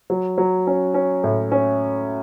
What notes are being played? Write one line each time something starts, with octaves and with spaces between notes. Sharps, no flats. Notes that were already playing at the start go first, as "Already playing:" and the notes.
F#3
F#3
C#4
C#4
A2
C#4